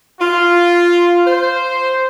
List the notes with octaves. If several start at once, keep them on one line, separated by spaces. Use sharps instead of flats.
F4
C5